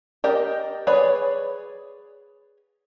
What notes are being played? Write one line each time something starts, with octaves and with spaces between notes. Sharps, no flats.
G4 A#4 D5 D#5
G#4 B4 C#5 D5 B5